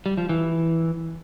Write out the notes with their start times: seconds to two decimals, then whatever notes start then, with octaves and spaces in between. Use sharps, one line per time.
0.06 G3
0.17 F3
0.29 E3